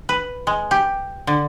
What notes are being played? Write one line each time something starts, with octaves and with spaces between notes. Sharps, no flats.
B4
G#3
G4
D3